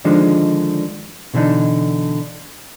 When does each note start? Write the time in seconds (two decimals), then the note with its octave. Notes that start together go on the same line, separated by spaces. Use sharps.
0.05 D3 D#3 F3 G#3 D4 D#4
1.34 B2 D3 E3 D4 D#4